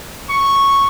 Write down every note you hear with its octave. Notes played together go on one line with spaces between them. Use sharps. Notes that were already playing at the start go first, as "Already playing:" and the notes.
C#6